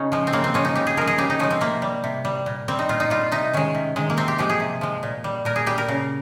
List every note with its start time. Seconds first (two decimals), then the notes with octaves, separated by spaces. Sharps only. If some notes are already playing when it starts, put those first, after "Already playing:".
Already playing: C#3 C#4 D#4
0.12 F3 G#3
0.27 C4
0.33 C#3 A#3
0.44 C4
0.54 F3 G#3 C#4
0.65 D#4
0.75 C#3 G4
0.87 G#4
0.97 F3 G#3 A#4
1.07 G#4
1.18 C#3 G4
1.30 D#4
1.39 F3 G#3 C#4
1.50 C4
1.61 C3 A#3
1.82 G3
2.04 C3
2.25 G3
2.46 A#2
2.68 G3 C4
2.79 D#4
2.89 A#2 F4
3.00 D#4
3.10 G3 F4
3.32 C3 D#4
3.53 D#3 G#3 C#4
3.75 C3
3.96 D#3 G#3
4.10 A#3
4.17 C3 C4
4.28 G4
4.38 F3 G#3 G4
4.49 G#4
4.60 C3
4.81 F3 G#3
5.03 A#2
5.24 G3
5.45 A#2 A#4
5.56 G#4
5.66 G3 G4
5.78 A#4
5.88 C#3